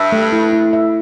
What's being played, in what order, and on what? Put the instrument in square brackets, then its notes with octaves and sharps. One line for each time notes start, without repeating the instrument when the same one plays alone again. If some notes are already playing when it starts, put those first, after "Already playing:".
Already playing: [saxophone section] G2 [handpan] E5
[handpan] A3
E4
E4
E5